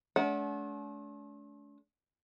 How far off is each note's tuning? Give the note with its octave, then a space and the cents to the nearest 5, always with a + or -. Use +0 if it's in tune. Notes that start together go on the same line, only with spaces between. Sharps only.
A3 -40 D4 -45 F#5 +0